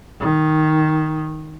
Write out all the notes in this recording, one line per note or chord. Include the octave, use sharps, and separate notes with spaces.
D#3